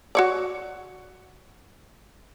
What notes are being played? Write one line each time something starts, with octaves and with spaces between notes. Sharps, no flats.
F#4 C#5 D5